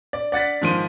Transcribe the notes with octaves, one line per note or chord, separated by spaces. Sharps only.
D5
D5 F#5 A6 B6
G#2 D#3 F3 C6 D#7